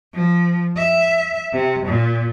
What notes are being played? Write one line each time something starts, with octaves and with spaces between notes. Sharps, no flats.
F3
E5
C3
A#2